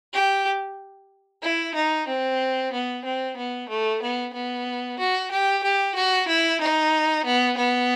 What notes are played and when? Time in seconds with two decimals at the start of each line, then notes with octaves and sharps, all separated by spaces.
0.14 G4
1.43 E4
1.75 D#4
2.08 C4
2.73 B3
3.05 C4
3.37 B3
3.69 A3
4.02 B3
4.34 B3
4.99 F#4
5.31 G4
5.63 G4
5.95 F#4
6.28 E4
6.61 D#4
7.25 B3
7.57 B3